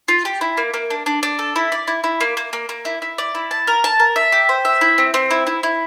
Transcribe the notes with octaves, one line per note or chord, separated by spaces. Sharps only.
F4
G4
E4
A#3
A#3
D4
D4
D4
A4
E4
D5
E4
E4
A#3
A#3
A#3
A#3
E4
E4
D5
E4
A5
A#4
A5
A#4
E5
G4
C5
E5
E4
C4
C4
E4
E4
E4